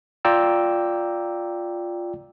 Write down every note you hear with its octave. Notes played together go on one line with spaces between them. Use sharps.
F4 D5 G5 A#5 E6